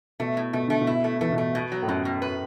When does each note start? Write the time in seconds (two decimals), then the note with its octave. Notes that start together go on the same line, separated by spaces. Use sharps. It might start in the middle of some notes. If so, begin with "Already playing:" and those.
0.20 B2 A3
0.37 A2
0.53 B2 A3
0.67 D3 A3
0.81 B2
0.87 E4
1.04 A3
1.21 E3 A3
1.32 B2
1.38 A3
1.55 B2
1.72 F#3
1.82 A2
1.88 F#2 B2
2.05 B2
2.22 B4